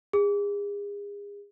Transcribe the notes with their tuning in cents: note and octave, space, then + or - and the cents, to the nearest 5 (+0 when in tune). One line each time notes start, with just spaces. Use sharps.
G#4 -35